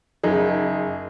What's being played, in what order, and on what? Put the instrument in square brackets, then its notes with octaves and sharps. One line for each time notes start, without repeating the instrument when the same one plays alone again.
[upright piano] F#1 D#4 G#4